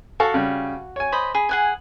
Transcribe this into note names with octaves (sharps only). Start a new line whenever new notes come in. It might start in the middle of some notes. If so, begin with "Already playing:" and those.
F#4 A4 F5 C#6
C#3 G3
C#5 G#5
C5 D#5 B5
G#4 B5
G#4 F#5 G#5